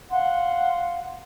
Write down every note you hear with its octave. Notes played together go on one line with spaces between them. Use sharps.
F5 F#5 C6